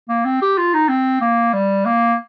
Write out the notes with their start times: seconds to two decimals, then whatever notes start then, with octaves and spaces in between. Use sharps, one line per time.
0.09 A#3
0.25 C4
0.42 G4
0.58 F4
0.74 D#4
0.88 C4
1.21 A#3
1.53 G3
1.85 A#3